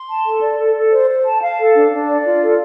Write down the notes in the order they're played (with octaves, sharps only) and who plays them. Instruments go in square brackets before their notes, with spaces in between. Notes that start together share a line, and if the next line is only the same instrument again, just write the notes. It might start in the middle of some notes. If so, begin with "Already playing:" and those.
Already playing: [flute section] C6
A5
A4
D5
A4
A4
C5
C5
A5
F5
A4
D4
D4
D5
F4
A4